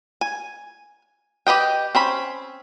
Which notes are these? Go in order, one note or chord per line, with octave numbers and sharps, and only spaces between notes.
G#5
G4 B4 D#5 G5
C4 C#4 B5